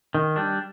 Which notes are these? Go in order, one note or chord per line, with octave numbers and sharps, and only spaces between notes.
D#3
G3 D4